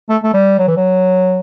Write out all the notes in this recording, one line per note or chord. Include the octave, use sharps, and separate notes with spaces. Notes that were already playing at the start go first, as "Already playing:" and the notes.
A3
A3
G3
F#3
E3
F#3